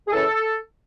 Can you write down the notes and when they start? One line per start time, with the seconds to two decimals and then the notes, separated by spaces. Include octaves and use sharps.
0.08 G#4
0.12 F#2 C#3 E3 A4